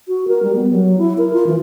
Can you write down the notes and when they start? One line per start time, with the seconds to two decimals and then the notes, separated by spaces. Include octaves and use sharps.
0.08 F#4
0.28 A#4
0.43 G3
0.56 B3
0.71 F#3
0.98 E4
1.18 A#4
1.33 F4
1.47 E3